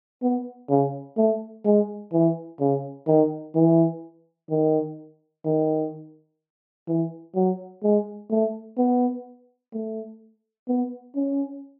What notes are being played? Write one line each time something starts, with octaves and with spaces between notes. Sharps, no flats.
B3
C#3
A3
G#3
E3
C#3
D#3
E3
D#3
D#3
E3
F#3
G#3
A3
B3
A3
B3
C#4